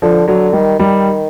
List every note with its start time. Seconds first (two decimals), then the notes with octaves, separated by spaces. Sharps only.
0.02 D3 F3
0.28 D3 F#3
0.53 D#3 G3
0.79 D#3 G3